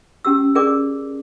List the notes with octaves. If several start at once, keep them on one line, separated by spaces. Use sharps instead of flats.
C#4 G4 E6
G#4 A#4 D5 D6